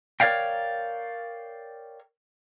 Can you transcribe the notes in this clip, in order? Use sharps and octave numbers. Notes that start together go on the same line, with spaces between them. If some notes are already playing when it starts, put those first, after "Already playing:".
A#4 C#5 D5 F5 G5